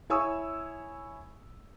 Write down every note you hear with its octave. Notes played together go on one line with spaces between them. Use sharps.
E4 C#5 G#5 C#6 D#6 E6